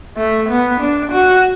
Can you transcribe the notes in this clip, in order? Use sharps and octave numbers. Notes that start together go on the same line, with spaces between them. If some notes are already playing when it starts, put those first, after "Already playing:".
A3
B3
D4
F#4